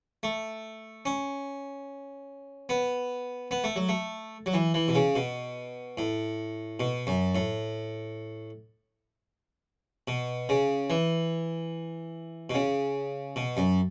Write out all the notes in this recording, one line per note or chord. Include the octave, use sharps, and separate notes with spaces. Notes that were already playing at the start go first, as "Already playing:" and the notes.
A3
C#4
B3
B3
A3
F#3
A3
F#3
E3
E3
B2
C#3
B2
A2
B2
F#2
A2
B2
C#3
E3
B2
C#3
B2
F#2